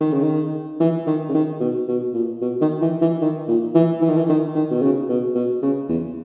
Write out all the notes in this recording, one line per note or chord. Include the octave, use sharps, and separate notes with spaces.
D#3
C#3
D#3
E3
D#3
C#3
D#3
B2
B2
A#2
B2
D#3
E3
E3
D#3
A#2
E3
E3
D#3
E3
D#3
D#3
B2
C#3
B2
B2
C#3
E2